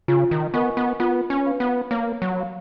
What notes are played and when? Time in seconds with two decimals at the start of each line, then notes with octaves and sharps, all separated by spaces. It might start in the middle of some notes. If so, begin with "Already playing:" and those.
0.08 C#3 F4
0.31 D#3
0.54 B3 A#4 D#5 G#5 C#6
0.77 B3
1.00 B3 F4
1.30 C#4
1.45 B4 F5 B5
1.60 B3
1.91 A#3 C#5
2.22 F#3
2.36 F5 B5